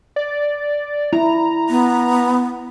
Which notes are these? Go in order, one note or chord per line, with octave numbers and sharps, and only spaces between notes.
D5
E4 A#5
B3